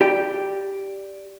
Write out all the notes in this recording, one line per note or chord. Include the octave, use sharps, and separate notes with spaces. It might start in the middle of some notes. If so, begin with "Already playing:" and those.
G4 D5 G5